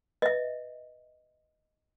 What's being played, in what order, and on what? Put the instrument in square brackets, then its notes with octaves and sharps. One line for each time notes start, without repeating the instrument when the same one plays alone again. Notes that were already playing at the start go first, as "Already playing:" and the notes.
[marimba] B4 [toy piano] D#5 E5